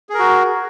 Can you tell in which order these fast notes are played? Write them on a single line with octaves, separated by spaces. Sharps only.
G#4 A#4 F#4